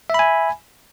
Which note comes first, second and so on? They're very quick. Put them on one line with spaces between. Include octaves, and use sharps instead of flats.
E5 B5 G#5